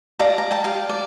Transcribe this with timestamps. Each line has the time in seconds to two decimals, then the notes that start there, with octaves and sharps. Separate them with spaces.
0.19 D5 F5 A5 A#5
0.38 A#5
0.51 G5 A5
0.64 G4 F5
0.89 D5